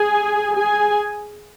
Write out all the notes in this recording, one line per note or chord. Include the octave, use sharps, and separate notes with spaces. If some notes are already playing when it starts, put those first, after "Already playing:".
Already playing: G#4 G#5
G#4 G#5